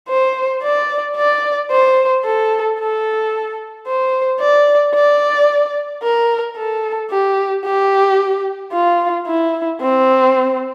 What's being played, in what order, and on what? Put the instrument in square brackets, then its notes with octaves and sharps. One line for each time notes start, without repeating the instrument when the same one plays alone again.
[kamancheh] C5
D5
D5
C5
A4
A4
C5
D5
D5
A#4
A4
G4
G4
F4
E4
C4